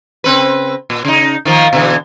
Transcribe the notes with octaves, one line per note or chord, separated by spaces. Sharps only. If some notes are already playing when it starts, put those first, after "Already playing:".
C#3 C4 B4
A#2
C#3 D#4
D#3 F3 A#3
B2 D3 E3